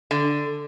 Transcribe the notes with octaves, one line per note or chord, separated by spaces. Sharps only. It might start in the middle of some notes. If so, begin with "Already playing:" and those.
D3